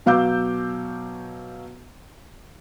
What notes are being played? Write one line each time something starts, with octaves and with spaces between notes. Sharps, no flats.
B2 F#3 F5 D6 E6 G6